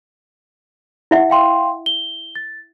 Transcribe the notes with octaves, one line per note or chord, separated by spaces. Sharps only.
E4 E5 F#5
F5 G5 C6
G7
A6